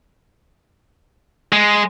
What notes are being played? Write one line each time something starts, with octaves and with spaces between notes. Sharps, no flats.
G#3